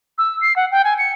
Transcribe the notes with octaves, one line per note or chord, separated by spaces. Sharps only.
E6
C7
F#5
G5
G#5
C#7